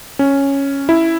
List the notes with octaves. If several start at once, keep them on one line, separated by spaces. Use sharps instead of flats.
C#4
E4